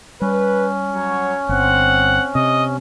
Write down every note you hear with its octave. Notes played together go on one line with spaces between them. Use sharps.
G3 C#4 B4
F#3 C#5
G1 C4 F#5
C3 D#5